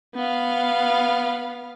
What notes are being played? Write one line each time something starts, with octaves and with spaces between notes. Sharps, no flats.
B3 F5